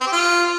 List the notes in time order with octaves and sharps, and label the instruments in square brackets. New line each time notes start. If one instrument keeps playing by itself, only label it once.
[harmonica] C4
G4
F4